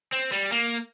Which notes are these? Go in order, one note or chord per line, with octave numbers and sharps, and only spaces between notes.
C4
G3
A#3